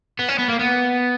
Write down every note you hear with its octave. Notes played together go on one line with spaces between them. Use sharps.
B3
C#4
B3
A#3
B3